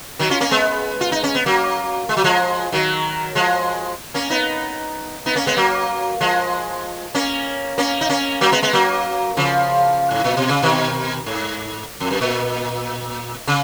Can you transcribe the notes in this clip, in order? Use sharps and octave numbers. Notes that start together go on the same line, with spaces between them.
D#3 F#3
C#4 F4
A#3 C#4
G#3 B3
F4
D#4
C#4
B3
F#3 A#3
G#3
F#3
F3 G#3
D#3 F#3
F3 G#3
A#3 C#4
B3 D#4
B3 D#4
A#3 C#4
G#3 B3
F#3 A#3
F3 G#3
A#3 C#4
A#3 C#4
D#4
A#3 C#4
F#3 A#3
G#3 B3
G#3 B3
F#3 A#3
C#3 F3
G#2
A#2
B2
C#3
B2 D#3
G#2
F2
F#2
A#2
C#3